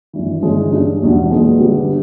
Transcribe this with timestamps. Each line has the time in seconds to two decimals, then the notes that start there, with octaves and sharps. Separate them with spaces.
0.13 G#1 G2 E3
0.42 G1 G2 E3 G#3 C#4
0.72 G2 G3 C#4
1.02 E1 E2 B2
1.31 B1 A#2 G#3 B3
1.60 G1 G2 G3 B3